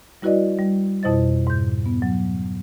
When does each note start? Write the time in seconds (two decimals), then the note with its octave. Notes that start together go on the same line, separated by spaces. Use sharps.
0.22 G3 E4 F#4 B4 D5 D#5
0.59 G3
1.03 F2 B2 E4 C5 D#5 A6
1.47 G#2 G6
1.86 B3
2.02 F#3